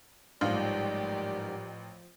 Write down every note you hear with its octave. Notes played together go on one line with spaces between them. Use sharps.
A1 G#2 F3 G3 G4 A#4 D5